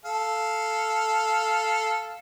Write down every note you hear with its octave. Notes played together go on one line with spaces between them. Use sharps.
A4 F5